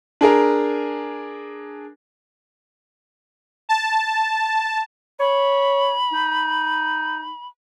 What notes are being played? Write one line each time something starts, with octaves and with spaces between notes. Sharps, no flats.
D4 G#4 A#4 A#5
A5
C#5 B5
D#4